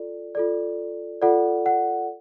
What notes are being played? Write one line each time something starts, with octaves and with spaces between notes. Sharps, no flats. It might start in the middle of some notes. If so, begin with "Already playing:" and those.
Already playing: F4 A4 D5
F4 A4 D5
F4 A4 D5 F#5
F#5